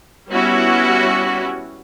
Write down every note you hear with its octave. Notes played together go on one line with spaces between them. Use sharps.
G3 B3 C#4 E4 F#4